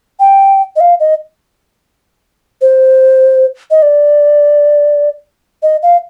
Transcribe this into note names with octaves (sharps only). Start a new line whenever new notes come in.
G5
D#5
F5
D#5
C5
D#5
D5
D#5
F5